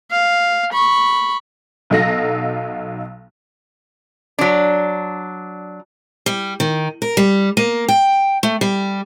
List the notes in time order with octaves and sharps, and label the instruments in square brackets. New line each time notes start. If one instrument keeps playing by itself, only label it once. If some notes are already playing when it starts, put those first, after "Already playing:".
[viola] F5
B5 C#6
[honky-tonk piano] B1 F#3 D#4 A4 F5 A#6
[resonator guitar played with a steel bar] F#3 D4
[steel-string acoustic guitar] G3
D#3
A#4
G3
A#3
G5
A3
G3